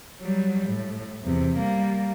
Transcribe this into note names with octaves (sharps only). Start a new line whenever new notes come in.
F#3 G3
A2
E2 C3
G3 A#3